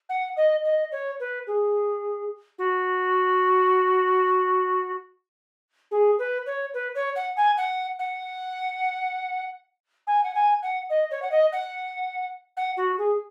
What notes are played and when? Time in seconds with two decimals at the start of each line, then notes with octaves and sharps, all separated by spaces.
0.09 F#5
0.37 D#5
0.64 D#5
0.92 C#5
1.20 B4
1.47 G#4
2.58 F#4
5.91 G#4
6.19 B4
6.46 C#5
6.74 B4
6.95 C#5
7.16 F#5
7.37 G#5
7.57 F#5
7.99 F#5
10.07 G#5
10.24 F#5
10.35 G#5
10.63 F#5
10.90 D#5
11.11 C#5
11.22 F#5
11.31 D#5
11.52 F#5
12.57 F#5
12.77 F#4
12.98 G#4